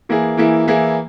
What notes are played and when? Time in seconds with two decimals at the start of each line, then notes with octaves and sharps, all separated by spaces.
0.09 E3 A#3 E4 G#4
0.37 E3 A#3 E4 G#4
0.67 E3 A#3 E4 G#4